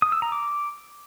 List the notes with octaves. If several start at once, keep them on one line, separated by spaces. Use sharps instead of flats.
D#6
E6
A#5
D6